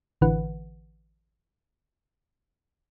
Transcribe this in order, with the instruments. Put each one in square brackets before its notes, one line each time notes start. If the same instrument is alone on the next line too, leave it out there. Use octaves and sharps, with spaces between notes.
[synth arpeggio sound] A1 D3 E3 B4 F#5